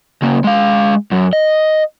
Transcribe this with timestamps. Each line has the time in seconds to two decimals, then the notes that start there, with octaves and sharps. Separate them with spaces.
0.22 C#3 A#3
0.44 G#3 F5
1.11 F#2 F#3
1.33 D#5